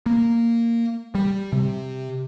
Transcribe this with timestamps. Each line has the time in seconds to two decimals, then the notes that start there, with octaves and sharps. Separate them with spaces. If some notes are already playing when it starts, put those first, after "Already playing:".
0.06 A#3
1.15 G3
1.52 C3